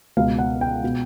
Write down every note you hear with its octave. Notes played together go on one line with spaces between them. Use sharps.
C#2 B2 F5
F#5
G5
B2